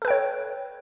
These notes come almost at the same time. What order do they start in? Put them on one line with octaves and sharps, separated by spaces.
A4 B4 G5 C#5